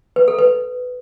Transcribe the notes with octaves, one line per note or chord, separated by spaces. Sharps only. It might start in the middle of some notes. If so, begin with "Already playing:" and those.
B4
A4
B4